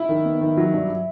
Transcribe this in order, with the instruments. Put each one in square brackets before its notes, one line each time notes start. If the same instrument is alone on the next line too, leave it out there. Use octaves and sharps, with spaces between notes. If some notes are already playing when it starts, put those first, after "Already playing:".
Already playing: [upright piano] E4
[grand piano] D#3
B3
D#3
F#3
G2